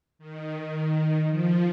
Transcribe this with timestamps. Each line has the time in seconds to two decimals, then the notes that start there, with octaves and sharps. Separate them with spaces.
0.19 D#3
1.28 F3